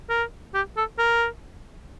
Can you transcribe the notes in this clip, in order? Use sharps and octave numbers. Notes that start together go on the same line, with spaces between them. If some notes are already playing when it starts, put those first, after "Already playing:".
A#4
G4
A4
A#4